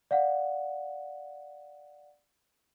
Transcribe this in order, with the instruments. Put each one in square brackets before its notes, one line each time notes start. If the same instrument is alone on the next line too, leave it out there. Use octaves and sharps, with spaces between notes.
[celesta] D5 F5 F#5